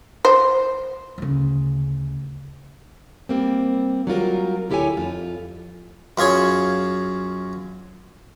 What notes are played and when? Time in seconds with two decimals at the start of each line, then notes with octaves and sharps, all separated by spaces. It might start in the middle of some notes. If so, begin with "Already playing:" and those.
0.25 C5
1.18 D2 C#3
3.29 G3 A#3 C4
4.07 F#3 G3 F4 A#4
4.70 D2 E4 G4 A4 C#5 G#5
4.97 F2 F4
6.18 F#2 F4 G#4 C#5